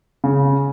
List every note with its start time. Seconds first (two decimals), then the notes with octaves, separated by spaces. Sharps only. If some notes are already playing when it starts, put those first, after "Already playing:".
0.24 C#3